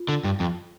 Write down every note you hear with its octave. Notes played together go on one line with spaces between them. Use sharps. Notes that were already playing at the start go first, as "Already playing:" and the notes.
Already playing: F4
D3
G2
F2